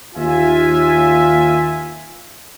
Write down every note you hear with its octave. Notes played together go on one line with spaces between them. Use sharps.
D#2 F4 E5 G#5